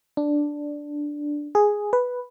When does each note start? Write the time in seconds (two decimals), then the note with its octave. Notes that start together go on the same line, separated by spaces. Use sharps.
0.17 D4
1.55 G#4
1.93 B4